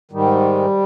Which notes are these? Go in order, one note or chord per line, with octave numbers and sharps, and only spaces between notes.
G#2 D#3 G3